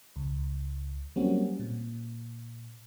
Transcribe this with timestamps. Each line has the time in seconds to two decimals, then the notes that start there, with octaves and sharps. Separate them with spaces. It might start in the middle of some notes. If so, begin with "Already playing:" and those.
0.16 C#2
1.16 F#3 G3 A#3 C4 C#4 F#4
1.59 A#2